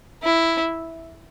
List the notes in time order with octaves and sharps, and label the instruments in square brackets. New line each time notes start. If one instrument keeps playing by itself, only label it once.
[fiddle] E4